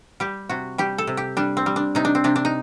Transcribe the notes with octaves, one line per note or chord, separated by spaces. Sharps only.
G3 G4
C3 F#4
G3 G4
A4
C3
G4
G3 D4
C4
G3
D4
C3 D#4
D4
C4
C3 D4
D4
D#4